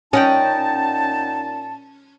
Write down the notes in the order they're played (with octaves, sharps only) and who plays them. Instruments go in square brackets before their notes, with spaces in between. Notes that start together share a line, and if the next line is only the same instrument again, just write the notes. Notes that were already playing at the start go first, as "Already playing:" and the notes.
[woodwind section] A#2 D#4 A5 [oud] C#4 [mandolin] D#5 F#5 G5